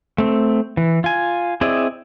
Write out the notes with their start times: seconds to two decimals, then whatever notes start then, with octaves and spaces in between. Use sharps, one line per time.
0.18 A3 C4
0.77 E3
1.04 F4 G#5
1.61 C4 E4 G#4 D5 D#5